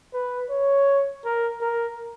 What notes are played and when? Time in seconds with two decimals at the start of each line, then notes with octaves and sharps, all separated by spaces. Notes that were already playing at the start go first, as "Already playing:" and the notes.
0.13 B4
0.50 C#5
1.25 A#4
1.61 A#4